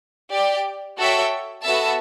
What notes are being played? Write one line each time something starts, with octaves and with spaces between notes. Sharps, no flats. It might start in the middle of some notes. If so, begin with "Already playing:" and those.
G4 D5 G5
F#4 A4 C#5 E5 G5
B3 F#4 A4 E5 A5